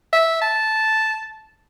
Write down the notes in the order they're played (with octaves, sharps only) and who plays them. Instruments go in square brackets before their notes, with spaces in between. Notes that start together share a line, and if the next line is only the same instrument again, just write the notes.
[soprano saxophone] E5
A5